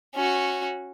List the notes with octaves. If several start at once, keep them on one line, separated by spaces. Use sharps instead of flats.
C#4 F#4